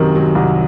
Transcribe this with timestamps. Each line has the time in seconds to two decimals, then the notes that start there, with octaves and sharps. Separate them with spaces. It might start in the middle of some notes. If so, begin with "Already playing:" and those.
Already playing: F#2 C3 D#3 F#4 A#4
0.15 F#3
0.35 C2